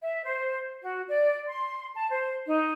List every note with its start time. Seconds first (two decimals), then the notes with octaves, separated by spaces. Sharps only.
0.02 E5
0.23 C5
0.82 F#4
1.08 D5
1.47 C6
1.95 A5
2.10 C5
2.47 D#4